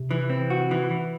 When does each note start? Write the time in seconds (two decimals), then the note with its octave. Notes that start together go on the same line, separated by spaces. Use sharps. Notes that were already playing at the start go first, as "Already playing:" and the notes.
Already playing: C3
0.11 E3
0.30 C4
0.50 F#4
0.71 E3
0.91 E3